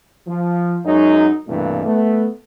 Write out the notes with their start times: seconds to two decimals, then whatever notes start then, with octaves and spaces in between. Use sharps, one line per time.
0.27 F3
0.85 F#2 F#3 G#3 D#4
1.48 C2 G2 B2 E3 A3 A#3
1.86 A3 B3